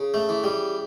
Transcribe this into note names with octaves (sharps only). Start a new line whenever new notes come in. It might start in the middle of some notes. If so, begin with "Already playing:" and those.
Already playing: C#3
A3
E3
G3